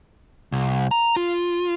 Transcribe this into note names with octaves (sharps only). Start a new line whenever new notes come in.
C2
A#5
F4